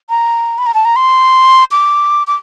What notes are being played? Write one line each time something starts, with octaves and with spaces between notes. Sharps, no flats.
A#5
B5
A#5
A5
A#5
C6
D6
D6